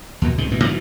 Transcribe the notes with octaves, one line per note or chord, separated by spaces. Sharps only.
D#2 B2
C#2 G#2 C3 D#3
A1 B2 E3
G#2 D3 E3 F#3